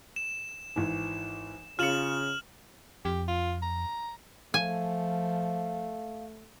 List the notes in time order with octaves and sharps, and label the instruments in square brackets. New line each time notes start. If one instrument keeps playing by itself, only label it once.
[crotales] E7
[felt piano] G#1 E3
[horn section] C#3 [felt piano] F4 C#7 [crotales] F6 E7 F#7
[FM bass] F2 [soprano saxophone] G4
[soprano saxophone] F4
A#5
[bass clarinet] F3 [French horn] A3 [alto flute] F5 [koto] G#5